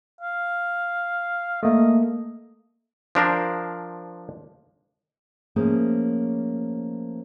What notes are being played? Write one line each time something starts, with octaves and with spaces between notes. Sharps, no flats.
F5
A3 A#3 D#5
F3 D4 A#4 C5
F3 A3 A#3 C#4 G#4 C5